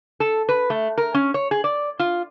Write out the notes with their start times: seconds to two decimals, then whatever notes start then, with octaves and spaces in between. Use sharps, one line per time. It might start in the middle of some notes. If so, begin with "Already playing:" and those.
0.20 A4
0.49 B4
0.70 A3
0.98 A#4
1.14 C#4
1.34 C#5
1.51 G#4
1.64 D5
1.99 F4